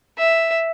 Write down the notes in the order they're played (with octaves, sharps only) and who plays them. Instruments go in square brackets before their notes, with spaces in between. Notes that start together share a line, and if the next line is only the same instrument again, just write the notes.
[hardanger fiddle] E5